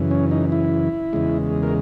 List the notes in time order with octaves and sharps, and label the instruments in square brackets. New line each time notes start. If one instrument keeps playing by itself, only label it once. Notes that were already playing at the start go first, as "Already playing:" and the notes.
Already playing: [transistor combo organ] F#2 C#3 E3
C#4
D#4
E4
E2 C#3 G#3
A#4